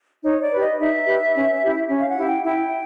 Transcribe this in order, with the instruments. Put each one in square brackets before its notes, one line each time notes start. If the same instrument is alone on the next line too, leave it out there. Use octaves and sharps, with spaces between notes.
[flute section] D#4 C#5
D5
G4 B4
D#5
D#4 E5
G4 B4
C#4
E4 G4
C#4
F5
F#5
E4 G4
G5
E4 G5